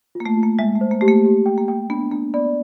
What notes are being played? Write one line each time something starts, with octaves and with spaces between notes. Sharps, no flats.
F4
A#3
A3
F4
A#3
G#3 E5
A3
C5
A#3
A3 G4
A#3
G4
G5
A#3
G5
B3 D4
A#3 D4
B3 D5